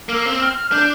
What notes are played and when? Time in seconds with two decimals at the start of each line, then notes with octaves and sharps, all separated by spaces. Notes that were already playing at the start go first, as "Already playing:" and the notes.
0.09 A#3 F6
0.15 E6
0.26 C4
0.41 F6
0.56 F6
0.72 D4 G6